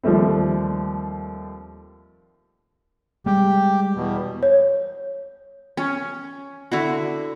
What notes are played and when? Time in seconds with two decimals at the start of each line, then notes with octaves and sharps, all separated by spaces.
0.03 D#2 F3 G3 A3 C4
3.26 G3 G#3 G4
3.95 E2 B2
4.43 C#5
5.77 C#4
6.72 D3 E4 F#4